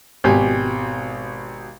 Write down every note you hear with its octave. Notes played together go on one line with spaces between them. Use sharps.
G#1 B2 G4 G#5